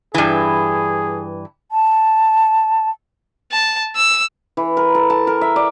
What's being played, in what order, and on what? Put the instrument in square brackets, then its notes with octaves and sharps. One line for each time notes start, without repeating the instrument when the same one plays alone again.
[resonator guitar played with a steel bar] G2 E3 [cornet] G#4
[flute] A5
[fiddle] A5
E6
[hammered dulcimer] E3
A#4
A4
A5
A#4
E5
D5